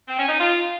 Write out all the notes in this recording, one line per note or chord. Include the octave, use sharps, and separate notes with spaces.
C4
C#4
D#4
F4